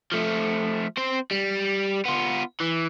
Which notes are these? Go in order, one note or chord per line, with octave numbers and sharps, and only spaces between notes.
F3 A3
C4 C5
G3
B3 F4
E3